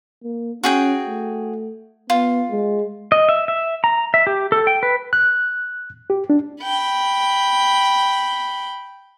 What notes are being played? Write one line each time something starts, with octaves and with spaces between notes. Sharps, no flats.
A#3
C#4 F#4 G#4 G5
A3
B3 F4
G#3
D#5
E5
E5
A#5
E5
G4
A4
G5
B4
F#6
G4
D4
G5 B5